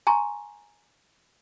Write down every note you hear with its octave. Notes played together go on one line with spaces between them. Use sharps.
G#5 A#5 C6 C#6